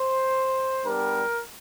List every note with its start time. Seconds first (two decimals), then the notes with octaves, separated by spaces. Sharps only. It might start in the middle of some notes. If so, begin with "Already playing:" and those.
Already playing: C5
0.84 G3 B3 D4 G4 A#4